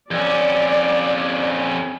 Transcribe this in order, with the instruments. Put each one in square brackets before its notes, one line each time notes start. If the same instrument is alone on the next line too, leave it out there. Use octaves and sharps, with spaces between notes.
[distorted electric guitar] F2 C#4 [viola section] D5